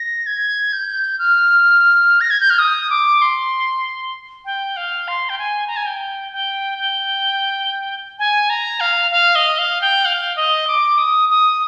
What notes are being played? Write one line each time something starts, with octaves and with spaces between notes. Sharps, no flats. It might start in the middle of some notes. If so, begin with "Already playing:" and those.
Already playing: A#6
G#6
G6
F6
A#6
G#6
G6
F6
D#6
D6
C6
G5
F5
C6
G5
G#5
A#5
G#5
G5
G5
G5
G#5
A#5
F5
F5
D#5
F5
G5
F5
D#5
D6
D#6
D#6